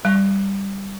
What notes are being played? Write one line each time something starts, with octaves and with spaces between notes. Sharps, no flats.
G3